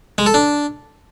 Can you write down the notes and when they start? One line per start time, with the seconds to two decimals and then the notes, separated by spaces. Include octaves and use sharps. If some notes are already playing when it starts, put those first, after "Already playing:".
0.18 G#3
0.26 A4
0.34 D4